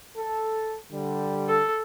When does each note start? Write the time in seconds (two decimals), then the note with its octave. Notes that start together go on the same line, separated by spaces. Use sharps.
0.18 A4
0.92 D3 G3
1.48 A4